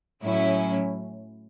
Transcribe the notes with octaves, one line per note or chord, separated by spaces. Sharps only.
A2 F#3 C#4 E4